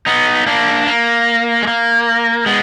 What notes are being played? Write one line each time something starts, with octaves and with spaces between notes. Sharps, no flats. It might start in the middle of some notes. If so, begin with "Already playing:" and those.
B3 D#4
A#3 D4
A#3
G#3
A#3
G#3 B3